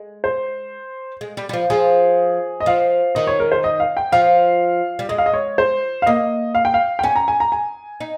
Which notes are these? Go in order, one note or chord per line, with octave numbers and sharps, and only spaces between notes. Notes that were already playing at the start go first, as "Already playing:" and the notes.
Already playing: G#3
C5
G#3
G3
G3
F3
F3 G#4
D#5
F3 F5
D#3 D#5
C#5
A#4
C5
D#5
F5
G5
F3 F5
G3
G#3 D#5
F5
D#5
C#5
C5
F5
A#3 D#5
F5
G5
F5
G5
C#4 G#5
A#5
G#5
A#5
G#5
D#4